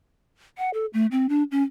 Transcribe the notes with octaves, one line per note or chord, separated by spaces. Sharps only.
F#5
A4
A3
C4
D4
C#4